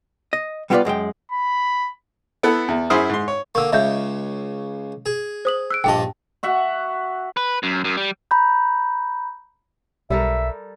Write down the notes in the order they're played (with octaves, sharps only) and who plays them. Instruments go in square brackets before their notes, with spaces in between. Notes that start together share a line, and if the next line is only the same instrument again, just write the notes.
[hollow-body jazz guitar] D#5
G3 B3 E4 F4 B4 D5
F#2 G#3 A4 G5
[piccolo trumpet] B5
[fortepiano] B3 E4 A4 F#5
E2
F#2 E4 G#4 C5 D#6 F6
G#2 C6
C#5
[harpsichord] D3 A#3 [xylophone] C#6 E6
[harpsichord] C#2 C#3 [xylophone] D#5 E5 G6
[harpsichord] G#4
[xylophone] C5 D#6 F#7
E6 F#6 D7
[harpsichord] A#1 G2 D#5 [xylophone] G5 A5
[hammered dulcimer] F#4 E5 F#5
[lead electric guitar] B4
F#2
F#2
G3
[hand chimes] A#5 B5 G6
[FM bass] B1 [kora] G3 A4 A#4 [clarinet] E5